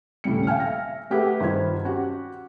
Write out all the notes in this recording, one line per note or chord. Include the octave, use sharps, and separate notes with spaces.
D#1 A2 C#3 G3 C#7
F5 G5 G#5 F6
E5 A#6
A3 G4 G#4 B4 E5 F#5
G2 D#3 F4 C5 G#6
C#4 F#4 G4 F#5